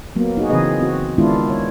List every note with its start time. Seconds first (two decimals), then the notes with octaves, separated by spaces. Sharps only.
0.16 F#3 A#3 B3
0.37 D#4 F#4 G#4
0.50 C#3 E3 C4 G#4 B4 D#5
0.80 C4 F#4
1.18 D#3 G#3 B3 D4 E4 F4
1.50 C#5